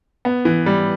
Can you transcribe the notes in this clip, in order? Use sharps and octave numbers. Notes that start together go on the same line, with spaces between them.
B3
E3
G3